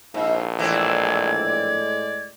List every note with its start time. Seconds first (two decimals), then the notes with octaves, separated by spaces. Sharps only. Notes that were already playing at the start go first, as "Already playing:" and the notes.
0.14 A#1 G#2 F5
0.59 A2 E3 G#3 C4 D5 G#6